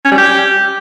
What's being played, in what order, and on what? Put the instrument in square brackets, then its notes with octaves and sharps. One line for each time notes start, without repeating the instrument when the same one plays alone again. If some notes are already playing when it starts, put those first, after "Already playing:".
[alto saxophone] C#4
G3
G4